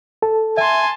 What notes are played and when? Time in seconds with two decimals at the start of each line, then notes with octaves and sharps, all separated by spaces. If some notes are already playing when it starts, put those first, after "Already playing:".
0.22 A4 A5
0.57 E5 G#5 A5 C6